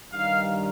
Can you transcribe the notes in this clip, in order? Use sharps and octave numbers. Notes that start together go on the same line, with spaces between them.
G2 D#3 G3 F5